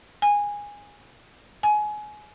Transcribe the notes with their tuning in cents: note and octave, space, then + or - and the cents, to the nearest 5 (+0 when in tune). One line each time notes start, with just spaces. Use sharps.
G#5 -15
G#5 +25